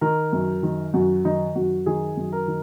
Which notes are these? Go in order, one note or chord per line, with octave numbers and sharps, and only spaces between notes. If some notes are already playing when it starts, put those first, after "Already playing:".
D#3 A#4
F#2
D#3
F#2 F#4
D#3 D#4
F#2 F#4
D#3 G#4
F#2
A#4
D#3